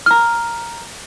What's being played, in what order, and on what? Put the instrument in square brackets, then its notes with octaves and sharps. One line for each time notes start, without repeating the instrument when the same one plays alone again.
[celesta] A#5 F6